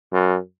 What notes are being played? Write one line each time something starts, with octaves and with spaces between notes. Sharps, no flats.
F#2